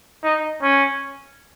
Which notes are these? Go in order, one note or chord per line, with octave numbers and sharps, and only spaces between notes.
D#4
C#4